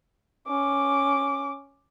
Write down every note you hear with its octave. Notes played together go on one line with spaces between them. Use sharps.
C#4 D6